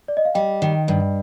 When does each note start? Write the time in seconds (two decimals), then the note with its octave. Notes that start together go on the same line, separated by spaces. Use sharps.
0.08 D5
0.17 D#5
0.25 F5
0.35 G3 D#5 G5
0.62 D#3
0.88 G2